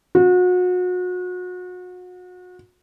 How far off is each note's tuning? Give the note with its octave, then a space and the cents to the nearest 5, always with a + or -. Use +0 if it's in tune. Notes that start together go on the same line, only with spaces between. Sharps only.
F#4 -35